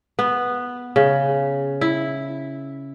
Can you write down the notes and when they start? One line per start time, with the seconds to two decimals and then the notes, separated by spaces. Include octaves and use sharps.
0.19 B3
0.96 C#3
1.81 E4